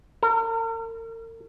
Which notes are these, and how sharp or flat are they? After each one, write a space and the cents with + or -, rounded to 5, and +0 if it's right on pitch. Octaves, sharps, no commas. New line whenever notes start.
A#4 -40